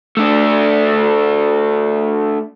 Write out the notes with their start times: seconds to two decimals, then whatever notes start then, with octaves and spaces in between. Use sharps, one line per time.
0.17 A3 D4